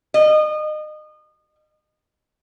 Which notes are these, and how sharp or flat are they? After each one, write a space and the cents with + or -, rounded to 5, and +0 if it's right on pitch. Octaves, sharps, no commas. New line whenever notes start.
D#5 -30